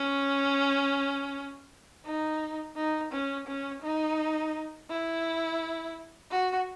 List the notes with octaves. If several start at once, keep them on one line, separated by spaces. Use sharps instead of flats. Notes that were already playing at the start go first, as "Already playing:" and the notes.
Already playing: C#4
D#4
D#4
C#4
C#4
D#4
E4
F#4